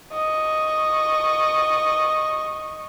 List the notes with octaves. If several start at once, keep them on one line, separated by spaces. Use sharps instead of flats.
D#5 C#6